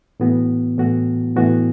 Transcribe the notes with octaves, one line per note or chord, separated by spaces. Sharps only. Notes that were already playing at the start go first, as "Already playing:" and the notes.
A2 E3 B3 F#4
A2 E3 B3 F#4
A2 E3 B3 F#4